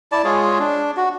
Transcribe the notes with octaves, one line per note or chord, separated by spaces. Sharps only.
E4 D5 A5
G#3 F4 G#4 C#5
D4
F#4